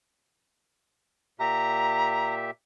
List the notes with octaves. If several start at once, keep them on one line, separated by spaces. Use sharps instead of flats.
A#2 G4 E5 A#5